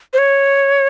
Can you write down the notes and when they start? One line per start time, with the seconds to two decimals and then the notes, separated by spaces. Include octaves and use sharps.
0.13 C5
0.18 C#5